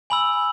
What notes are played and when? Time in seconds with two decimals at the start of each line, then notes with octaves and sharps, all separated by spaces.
0.10 G#5 B5 E6 F#7